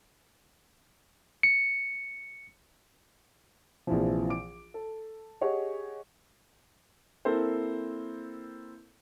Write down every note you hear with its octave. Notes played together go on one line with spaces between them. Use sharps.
C#7
A#1 C3 E3 F3
D6 D7
A4
G4 G#4 C#5 D#5 F#5 C#6
A#3 C4 E4 A4 A#4 C5